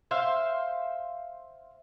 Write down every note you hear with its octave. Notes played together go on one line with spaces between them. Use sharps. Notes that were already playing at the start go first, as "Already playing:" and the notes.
C5 E5 F5